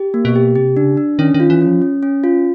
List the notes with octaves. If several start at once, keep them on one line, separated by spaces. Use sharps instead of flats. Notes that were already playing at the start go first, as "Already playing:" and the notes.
Already playing: G4
A#3
B2
G4
C3 G4
C#3 D4
D4
D#3 C#4
D#3
F4
E3
C#4
F3
C#4
C#4
F4